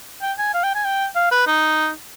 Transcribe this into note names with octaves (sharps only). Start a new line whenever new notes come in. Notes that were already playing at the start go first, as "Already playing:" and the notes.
G5
G#5
F5
G5
G#5
G5
F5
B4
D#4